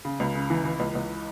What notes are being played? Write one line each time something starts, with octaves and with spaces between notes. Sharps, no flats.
C#3
C#2
C#3
E3
E3
C#2
C#2